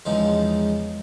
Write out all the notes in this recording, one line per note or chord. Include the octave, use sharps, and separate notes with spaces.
E2 C#3 F3 G#3 D#4